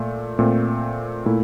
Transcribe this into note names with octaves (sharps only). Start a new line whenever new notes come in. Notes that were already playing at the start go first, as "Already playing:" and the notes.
Already playing: A#2 A3
A#2 A3 C4
A#2 A3 E4